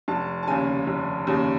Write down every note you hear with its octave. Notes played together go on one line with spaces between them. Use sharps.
F1 A5
A5
D#2 C#3 G#5
F1
D#2 C#3